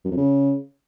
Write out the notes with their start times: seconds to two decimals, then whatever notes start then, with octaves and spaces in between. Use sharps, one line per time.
0.05 F#2
0.11 F2
0.17 C#3